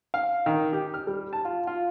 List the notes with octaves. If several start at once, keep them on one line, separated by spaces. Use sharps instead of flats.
F5
D#3
G4
F6
G3
A5
F4
F4